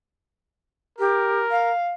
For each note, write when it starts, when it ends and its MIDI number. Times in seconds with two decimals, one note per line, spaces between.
0.99 1.40 67
0.99 1.71 70
1.50 1.89 77